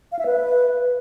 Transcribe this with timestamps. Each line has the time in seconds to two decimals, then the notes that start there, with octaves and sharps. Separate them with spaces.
0.12 F5
0.19 E5
0.26 B4